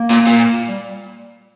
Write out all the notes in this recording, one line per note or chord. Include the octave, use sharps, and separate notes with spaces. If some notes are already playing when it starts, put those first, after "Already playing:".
Already playing: A#3
A#2
A#2
G3